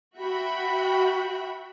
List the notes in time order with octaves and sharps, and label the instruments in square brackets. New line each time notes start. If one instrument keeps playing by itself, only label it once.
[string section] F#4 E5 G5 B5